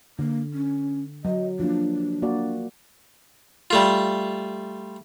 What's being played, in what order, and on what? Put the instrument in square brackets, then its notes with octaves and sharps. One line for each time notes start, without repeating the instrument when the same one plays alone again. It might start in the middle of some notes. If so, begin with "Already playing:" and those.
[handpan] D3 [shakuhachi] A#3
[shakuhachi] C#4
[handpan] F#3 [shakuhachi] D#5
[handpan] F3 A#3 [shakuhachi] D4
[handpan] A#3 F#4 D5
[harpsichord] G3 A3 F4